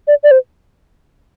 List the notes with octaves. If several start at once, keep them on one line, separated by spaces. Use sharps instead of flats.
D5
D5
C5